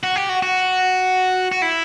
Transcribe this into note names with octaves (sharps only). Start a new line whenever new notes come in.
F#4
G4
F#4
F#4
F#4
E4